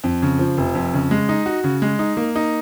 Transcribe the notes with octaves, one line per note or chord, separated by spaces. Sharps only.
F2
C#3
F3
F1
F2
C#3
G#3
D#4
F#4
C#3
G#3
D#4
A#3
D#4